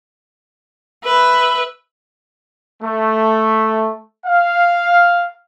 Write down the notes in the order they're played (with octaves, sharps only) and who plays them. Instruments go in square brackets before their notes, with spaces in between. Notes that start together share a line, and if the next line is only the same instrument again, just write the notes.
[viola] B4 E5
[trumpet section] A3
F5